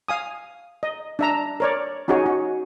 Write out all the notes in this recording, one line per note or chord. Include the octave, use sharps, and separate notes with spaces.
F5 G#5 D#6
D#5
D4 E5 A#5
A#4 C#5 D5
C#4 D#4 F#4 G#4 C#5
F#4